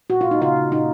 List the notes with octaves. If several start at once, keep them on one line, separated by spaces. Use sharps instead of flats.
A#2 F#4
A#2 F4
D#4
C#3 F4
C#3
A#2 D#4